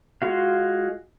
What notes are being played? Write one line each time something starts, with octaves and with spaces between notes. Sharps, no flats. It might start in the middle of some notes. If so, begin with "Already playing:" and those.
G#3 F4 F#4 F5